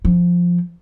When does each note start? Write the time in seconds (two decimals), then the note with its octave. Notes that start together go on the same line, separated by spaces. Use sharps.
0.05 F3